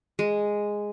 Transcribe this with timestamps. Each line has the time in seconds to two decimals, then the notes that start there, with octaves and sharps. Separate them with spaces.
0.19 G#3